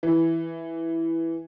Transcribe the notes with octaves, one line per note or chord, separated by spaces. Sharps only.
E3